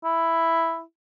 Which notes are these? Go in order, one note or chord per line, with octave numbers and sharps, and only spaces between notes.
E4